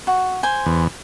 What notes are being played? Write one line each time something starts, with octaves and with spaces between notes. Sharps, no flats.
F#4
C5 G#5
E2